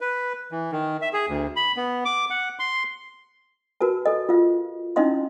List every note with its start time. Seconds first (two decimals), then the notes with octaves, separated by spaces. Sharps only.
0.01 B4
0.52 E3
0.72 D#3
1.01 E5
1.13 G#4
1.29 D2
1.56 B5
1.77 B3
2.05 D6
2.30 F#5
2.59 C6
3.81 F#4 A#4 B4 A5
4.06 A4 D#5
4.29 F4 F5
4.96 C#4 D#4 E4 D#5 F5 C6